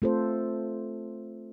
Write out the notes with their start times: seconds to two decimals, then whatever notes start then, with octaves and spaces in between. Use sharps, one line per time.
0.02 A3 C4 F4 A4 C5